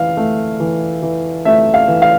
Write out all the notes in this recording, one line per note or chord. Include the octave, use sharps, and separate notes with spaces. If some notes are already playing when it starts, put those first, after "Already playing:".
Already playing: E3 F5
A3
E3
E3
A3 E5
F5
E3
F5